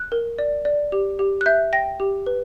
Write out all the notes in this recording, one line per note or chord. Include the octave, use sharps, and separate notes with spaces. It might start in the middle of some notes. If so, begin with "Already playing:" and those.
Already playing: F#6
A#4
D5
D5
G4
G4
F#6
E5 G6
G5 A#6
G4
B4